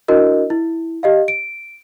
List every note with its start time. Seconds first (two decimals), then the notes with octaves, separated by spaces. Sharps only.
0.08 D4 E4 F#4 A#4 D#5
0.50 E4
1.03 G4 D#5 F5
1.28 D7